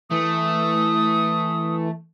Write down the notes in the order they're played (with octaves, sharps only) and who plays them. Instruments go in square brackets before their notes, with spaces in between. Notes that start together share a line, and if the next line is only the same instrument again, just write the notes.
[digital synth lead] E3 [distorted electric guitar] A3 [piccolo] D#6